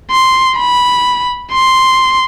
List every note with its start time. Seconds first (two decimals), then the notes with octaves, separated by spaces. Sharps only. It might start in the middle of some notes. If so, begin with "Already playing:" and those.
0.11 C6
0.58 B5
1.52 C6